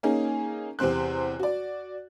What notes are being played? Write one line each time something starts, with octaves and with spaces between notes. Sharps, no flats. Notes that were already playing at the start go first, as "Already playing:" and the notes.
A#3 C#4 D#4 G#4
E2 C3 C4 C5 F#6
F#4 D5